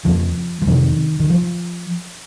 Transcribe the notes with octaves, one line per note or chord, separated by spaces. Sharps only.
F2 C#3 F3
F3
F2 C3 D#3
D#3
F3